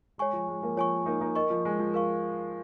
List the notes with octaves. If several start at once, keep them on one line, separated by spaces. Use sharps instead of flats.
G#3 C#5 G#5 C#6
F3
G#3
F3 A#3
F3 C#5 G#5 C#6
A#3 D#4
A#3 D#4
A#4 D#5 C#6
F3
G#3
F3
A#4 F5 C#6